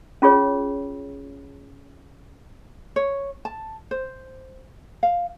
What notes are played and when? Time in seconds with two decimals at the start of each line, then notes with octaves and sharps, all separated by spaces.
0.22 C#4 F4 G#4 C#5
2.96 C#5
3.45 A5
3.91 C5
5.03 F5